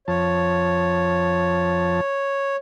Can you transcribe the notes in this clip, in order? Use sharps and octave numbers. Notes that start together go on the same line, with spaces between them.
F2 F3 C#5 A5